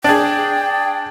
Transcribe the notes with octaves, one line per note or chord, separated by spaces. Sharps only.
D4 G#4 G5